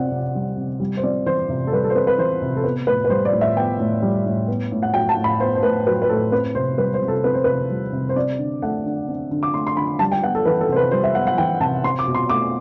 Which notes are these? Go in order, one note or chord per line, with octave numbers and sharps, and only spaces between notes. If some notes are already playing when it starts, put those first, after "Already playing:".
Already playing: C3 C4 D5 F#5
C3
G3
C3
G3
C5
C4 D5
E3 C5
C3
A4
G3 B4
A4
C5
C4 B4
B4
E3 C5
C3
A4
B3 B4
A2 B4
B4
G3 C5
D5
A2
E5
B3 G5
A2
G3
A2
B3
A2
F#5
F#3 G5
A5
A2
B5
B3 C5
C5
A2 B4
F#3 B4
B4
A2 A4
C4 B4
C3 C5
G3 B4
C5
C3
A4
C4 B4
C5
C3 B4
G3
C3
C5
C4 D5
D3
A3 F#5
D3
C4
D3
D6
A3 C6
C6
D3 B5
G3 A5
G5
B3 F#5
A4
E3 B4
A4
C3 C5
B4
G3 C5
E5
B3 F#5
F#5
E3 G5
C3 A5
C4 C6
D6
B2
C6
A3 D6